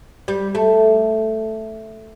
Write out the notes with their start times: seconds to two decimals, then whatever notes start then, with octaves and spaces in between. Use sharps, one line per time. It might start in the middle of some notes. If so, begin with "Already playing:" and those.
0.28 G3
0.55 A3